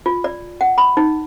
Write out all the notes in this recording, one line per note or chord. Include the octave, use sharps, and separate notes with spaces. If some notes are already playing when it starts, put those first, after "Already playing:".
F4
D5
F#5
B5
D#4